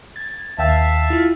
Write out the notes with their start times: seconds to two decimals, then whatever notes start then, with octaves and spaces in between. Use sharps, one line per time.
0.16 G#6 A6
0.59 D#2 E5 F5 G5 A5 E6
1.10 E4 F4